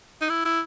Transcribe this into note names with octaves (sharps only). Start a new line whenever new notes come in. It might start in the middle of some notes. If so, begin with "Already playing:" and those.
D#4
E4
E4